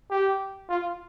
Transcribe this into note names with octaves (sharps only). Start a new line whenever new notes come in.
G4
F4